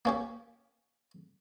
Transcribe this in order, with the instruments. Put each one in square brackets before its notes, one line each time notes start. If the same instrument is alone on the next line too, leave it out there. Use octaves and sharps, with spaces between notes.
[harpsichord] A#3 C#4 G4